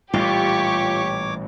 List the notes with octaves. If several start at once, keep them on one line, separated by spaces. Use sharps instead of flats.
A1 A#2 G3 F4 G4 C#5 C#6 D6